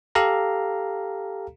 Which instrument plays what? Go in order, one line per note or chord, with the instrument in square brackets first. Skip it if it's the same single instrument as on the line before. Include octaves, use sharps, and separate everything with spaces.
[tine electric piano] G4 A4 F5 A#5